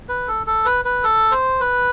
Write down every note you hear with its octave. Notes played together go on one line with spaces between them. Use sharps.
B4
A4
A4
B4
B4
A4
C5
B4